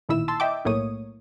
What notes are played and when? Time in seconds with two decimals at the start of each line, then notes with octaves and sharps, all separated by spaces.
0.09 A1 A#2 D#3 E4 E6
0.28 A5 C6 E6
0.40 D#5 E5 G5 D6
0.65 B1 A2 A#3 C#5 D#6